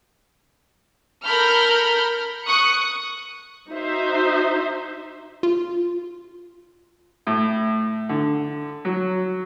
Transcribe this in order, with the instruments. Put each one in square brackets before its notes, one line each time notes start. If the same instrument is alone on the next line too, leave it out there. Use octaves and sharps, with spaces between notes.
[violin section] A4 A#4 B5 F6 G6
C#6 D#6 F#6 C#7
[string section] D#4 F#4 C5 E5
[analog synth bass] F4
[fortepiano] A2
D3
F#3